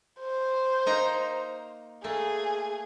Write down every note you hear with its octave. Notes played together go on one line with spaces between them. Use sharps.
C5
A#3 D#4 A#5
A3 A#3 G#4